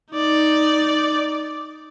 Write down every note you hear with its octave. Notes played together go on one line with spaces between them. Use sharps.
D#4 D5